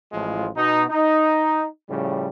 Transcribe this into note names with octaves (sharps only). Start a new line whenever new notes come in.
A1 A2 F3 G#3 F4
B2 D#4
D#4
A2 C#3 F3 G3